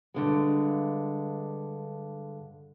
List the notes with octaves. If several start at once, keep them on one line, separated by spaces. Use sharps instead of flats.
G2 D3 G#3